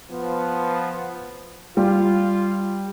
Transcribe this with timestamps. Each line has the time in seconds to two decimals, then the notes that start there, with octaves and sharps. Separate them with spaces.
0.11 F3 B3
1.77 G3 F4